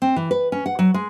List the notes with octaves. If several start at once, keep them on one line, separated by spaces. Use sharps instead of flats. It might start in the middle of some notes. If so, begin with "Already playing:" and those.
C4
E3
B4
C#4
F#5
F#3
G#3